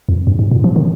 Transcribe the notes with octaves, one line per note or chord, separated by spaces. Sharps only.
F2
G2
G#2
A#2
F3
D#3